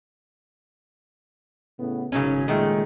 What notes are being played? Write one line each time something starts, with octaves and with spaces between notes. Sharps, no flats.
A2 C#3 B3
G#1 C#3 F#3 C#4
A#2 D#3 G#3 A3